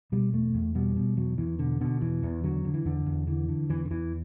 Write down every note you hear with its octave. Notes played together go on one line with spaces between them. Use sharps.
B2 G3
E2 A3
E2
B2 G3
B2
E2 F#3
E2 E3
B2 D3
B2 D3
E2 E3
E2
D3 F#3
D3
E3
E2 D3
E2
D3 E3
D3
E2 E3
D3
E2 E3